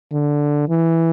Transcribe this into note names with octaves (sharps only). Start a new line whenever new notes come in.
D3
E3